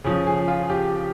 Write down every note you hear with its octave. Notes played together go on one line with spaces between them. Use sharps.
C#3 F3
G#4
F4
G4